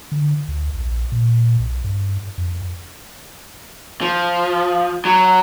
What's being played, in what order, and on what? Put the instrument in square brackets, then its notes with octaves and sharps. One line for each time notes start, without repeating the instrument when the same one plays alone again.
[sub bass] D3
D2
A#1
A#2
B1
G2
F2
[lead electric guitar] F3
F#3